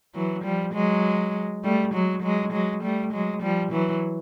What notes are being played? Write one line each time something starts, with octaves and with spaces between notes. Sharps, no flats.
E3 F#3
F3 G3
F#3 G#3
G3 A3
F#3 G#3
F#3 G#3
F#3 G#3
G3 A3
F#3 G#3
F3 G3
E3 F#3